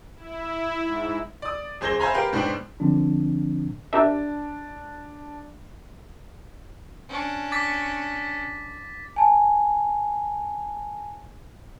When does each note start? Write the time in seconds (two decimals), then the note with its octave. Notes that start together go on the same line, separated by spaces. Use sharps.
0.16 E4
0.83 G#2
1.42 D5 D#6
1.81 D#1 G#4 C5 G#6 A#6 G7
1.99 C5 E5 F5 G#5 A#5 B5
2.14 G4 A#4 B4 F5 G5
2.33 G#2 B2 D4 C5 G5 F#7
2.80 D3 F3 C4 D4
3.93 D4 G4 A#4 E5
7.09 C#4 D4
7.52 D6 A6 B6
9.16 G#5 A5